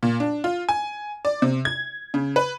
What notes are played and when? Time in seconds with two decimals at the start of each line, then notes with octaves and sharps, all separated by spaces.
0.03 A#2
0.20 D4
0.44 F4
0.69 G#5
1.25 D5
1.42 C3
1.65 G#6
2.14 C#3
2.36 B4